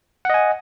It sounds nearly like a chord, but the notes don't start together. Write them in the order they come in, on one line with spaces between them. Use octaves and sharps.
F#5 D#5 G#5